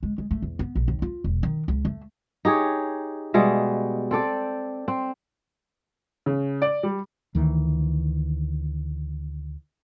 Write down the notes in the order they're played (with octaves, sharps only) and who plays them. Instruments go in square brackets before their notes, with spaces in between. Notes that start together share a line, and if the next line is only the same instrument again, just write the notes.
[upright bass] G#3
G#3
A3
E2
B3
A#1
D#2
F4
E1
D#3
C#2
A3
[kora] D#4 G4 G#4 C#5
B2 G3 G#3 E5
C4 A4 D5 G5
C4
[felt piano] C#3
D5
G3
[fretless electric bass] D2 D#3 E3